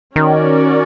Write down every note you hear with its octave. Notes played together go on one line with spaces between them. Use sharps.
D#3 C#4 F#4 A#4 D5